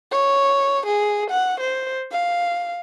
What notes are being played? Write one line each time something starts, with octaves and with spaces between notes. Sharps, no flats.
C#5
G#4
F#5
C5
F5